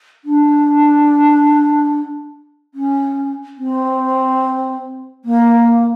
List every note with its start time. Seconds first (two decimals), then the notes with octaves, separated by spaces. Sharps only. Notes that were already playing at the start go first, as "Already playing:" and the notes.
0.24 D4
2.74 C#4
3.58 C4
5.24 A#3